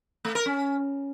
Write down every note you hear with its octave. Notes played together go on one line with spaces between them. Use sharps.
A3
A#4
C#4